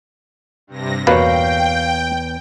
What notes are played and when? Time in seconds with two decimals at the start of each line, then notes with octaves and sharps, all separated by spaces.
0.67 G2 C3 A#6
1.07 E2 B2 A#3 B4 C#5 F5 G5